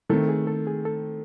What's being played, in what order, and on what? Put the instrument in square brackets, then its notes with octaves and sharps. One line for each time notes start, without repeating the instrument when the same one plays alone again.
[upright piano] D#3 A3 C4 [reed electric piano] A4
[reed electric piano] G#4
A4
G#4
A4